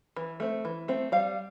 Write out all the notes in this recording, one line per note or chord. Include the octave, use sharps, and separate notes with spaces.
E3
A3 C4
E3
A3 C4
G3 F5